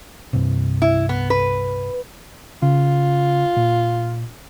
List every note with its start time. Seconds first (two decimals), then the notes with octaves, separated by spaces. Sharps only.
0.33 C2 G2 C3
0.82 E4
1.09 B3
1.30 B4
2.62 C#3 F4
3.57 A#2